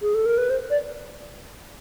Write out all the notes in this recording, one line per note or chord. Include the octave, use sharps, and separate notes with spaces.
G#4
A4
A#4
B4
C5
D5